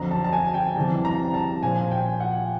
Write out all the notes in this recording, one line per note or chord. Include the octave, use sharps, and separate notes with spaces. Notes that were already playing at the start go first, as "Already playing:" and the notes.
Already playing: F2 D3 F#3 A#5
A5
A5
G#5
G5
F2 C3 E3 G3 A5
A#5
A5
A#2 F3 G#5
G5
F#5